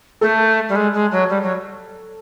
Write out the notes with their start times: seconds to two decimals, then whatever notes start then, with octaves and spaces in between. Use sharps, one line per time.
0.21 A3 A4
0.69 G3
0.76 G#3
0.93 G#3
1.12 F#3
1.29 G3
1.43 F#3